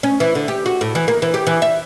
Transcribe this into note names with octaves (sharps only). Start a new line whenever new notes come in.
C#4
E3
D3
G4
F#4
A2
E3
A#3
E3
G4
E3
E5